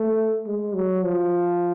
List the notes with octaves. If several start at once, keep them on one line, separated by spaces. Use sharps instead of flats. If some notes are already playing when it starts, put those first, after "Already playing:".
Already playing: A3
G#3
F#3
F3